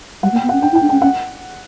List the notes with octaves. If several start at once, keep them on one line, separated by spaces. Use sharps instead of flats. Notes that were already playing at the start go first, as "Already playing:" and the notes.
G3 F#5
A#3
G5
B3
F#5
C#4
D4 G5
E4
G5
D4
C#4 G5
C#4 F#5